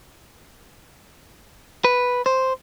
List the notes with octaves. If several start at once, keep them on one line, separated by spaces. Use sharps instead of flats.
B4
C5